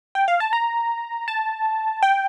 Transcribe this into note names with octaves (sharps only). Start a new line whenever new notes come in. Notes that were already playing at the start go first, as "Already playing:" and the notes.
G5
F5
A5
A#5
A5
G5